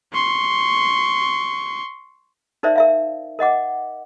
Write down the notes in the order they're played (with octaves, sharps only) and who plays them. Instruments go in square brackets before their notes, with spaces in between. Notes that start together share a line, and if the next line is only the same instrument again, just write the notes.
[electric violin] C6 C#6
[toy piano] D#4 A#4 C5 D5 E5
A#4 E5 F5
A#4 D#5 F#5 D6